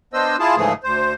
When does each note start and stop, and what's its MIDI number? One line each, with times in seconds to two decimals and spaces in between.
0.13 0.36 59
0.13 0.36 62
0.13 0.36 72
0.13 0.36 75
0.13 0.36 88
0.39 0.56 64
0.39 0.56 65
0.39 0.56 68
0.39 0.56 81
0.56 0.73 44
0.56 0.73 49
0.56 0.73 52
0.56 0.73 53
0.56 0.73 57
0.56 0.73 68
0.83 1.14 38
0.83 1.14 72